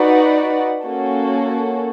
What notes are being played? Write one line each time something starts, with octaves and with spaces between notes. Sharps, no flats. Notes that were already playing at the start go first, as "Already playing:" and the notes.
Already playing: D#4 F#4 B4 D5 F#5
A#3 C#4 F#4 A4